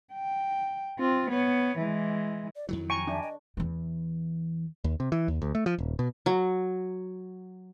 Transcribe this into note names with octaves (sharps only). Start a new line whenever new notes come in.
G5
C4 F4
B3 C#5
E3 G#3
D5
F2 D#3 F#3 E4
G5 G#5 A#5 C#6
D4 E5
D#5
E2 E3
D#2
C3
E3
D#2
D2
A3
F3
D#1
B2
F#3